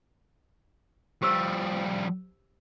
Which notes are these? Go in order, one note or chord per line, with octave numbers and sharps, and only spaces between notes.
F3 G3 G4 C5 E6